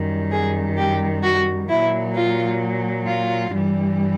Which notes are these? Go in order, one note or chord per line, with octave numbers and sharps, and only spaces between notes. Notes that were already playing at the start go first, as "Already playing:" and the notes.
Already playing: F#2 D#3 G3
G#4
G4
F#4
A#2 F#3 E4
F4
F4
G2 E3 G3